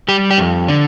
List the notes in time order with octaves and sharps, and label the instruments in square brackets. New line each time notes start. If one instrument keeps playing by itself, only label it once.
[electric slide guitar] G3 G4
G4
F2
D3